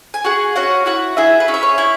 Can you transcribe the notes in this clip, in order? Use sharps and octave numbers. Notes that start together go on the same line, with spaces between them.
G#5
F#4 G#4 F#5
C#4 F#4 F#5
E4 F#4 F#5
E4 G#4 E5
B4
C#4
E5
C#5
E4